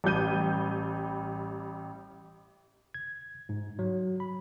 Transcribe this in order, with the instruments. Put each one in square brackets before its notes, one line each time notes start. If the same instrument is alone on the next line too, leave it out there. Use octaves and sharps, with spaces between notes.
[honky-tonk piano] A1 G3 G6 D#7
[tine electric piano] G#6
G#2
F#3
B5